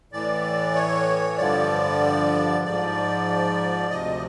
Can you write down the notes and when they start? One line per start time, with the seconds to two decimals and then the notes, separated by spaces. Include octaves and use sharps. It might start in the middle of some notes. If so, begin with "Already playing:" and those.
0.12 A2 E3 D5
0.75 C#5
1.38 G2 D3 F3 D5
2.64 G#2 F3 D5
3.90 D2 C3 F3 D#5